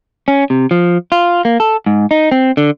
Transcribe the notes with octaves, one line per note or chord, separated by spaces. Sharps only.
C#4
C3
F3
F4
A#3
A4
G#2
D#4
C4
D3